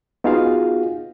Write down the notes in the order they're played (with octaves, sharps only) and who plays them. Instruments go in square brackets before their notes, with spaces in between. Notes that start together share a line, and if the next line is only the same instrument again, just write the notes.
[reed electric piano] B3 D#4 F4 F#4 G#4 F5